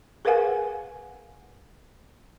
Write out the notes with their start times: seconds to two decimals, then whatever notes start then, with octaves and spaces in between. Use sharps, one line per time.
0.25 G#4 A#4 B4 F5 F#5 G#5